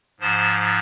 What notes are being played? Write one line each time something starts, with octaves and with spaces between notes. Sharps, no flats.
G#2 F3 C5